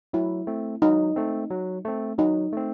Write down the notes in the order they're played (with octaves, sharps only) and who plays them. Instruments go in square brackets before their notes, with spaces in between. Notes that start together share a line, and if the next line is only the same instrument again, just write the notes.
[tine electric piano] F#3 [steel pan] E4
[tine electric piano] A3 C4
[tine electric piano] F#3 [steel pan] D#4
[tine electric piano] A3 C4
F#3
A3 C4
[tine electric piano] F#3 [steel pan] D#4
[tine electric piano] A3 C4